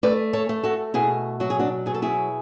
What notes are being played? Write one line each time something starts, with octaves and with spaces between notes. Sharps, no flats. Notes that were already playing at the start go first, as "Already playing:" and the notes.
A3 B4 D5
A4 C#5
A3
F#4 A4
B2 E4 G#4
F#3 F#4
G#4
D4 F#4
B2 G#4
A4
E4 G#4